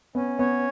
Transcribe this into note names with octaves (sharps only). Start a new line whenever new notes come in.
B3 C#4
B3 C#5